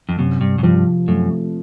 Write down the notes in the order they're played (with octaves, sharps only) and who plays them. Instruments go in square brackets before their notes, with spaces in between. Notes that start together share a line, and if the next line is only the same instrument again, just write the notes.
[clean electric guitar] F2
[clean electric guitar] F#2 [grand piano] C3
[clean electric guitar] G2
F#2
[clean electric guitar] G2 [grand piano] F3
[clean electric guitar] F#2 [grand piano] A3